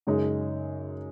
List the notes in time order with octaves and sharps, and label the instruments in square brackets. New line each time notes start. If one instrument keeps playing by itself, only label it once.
[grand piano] F#2 C#3 G#3 D#4